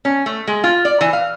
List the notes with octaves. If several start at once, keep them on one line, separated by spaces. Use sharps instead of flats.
C#4
A3
G#3
F4
D5
E3
F5